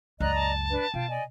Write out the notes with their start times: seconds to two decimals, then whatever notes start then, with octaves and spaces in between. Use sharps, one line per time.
0.20 C#2 F#2 D5 D#5 A#5 F#6
0.35 A5
0.70 D4 B4
0.94 B2 F4 G5
1.09 D5 D#5 G#5